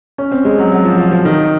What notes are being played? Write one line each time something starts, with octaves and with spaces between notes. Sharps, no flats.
C#4
C4
G#3
F#3
F#3
F3
F3
F3
D#3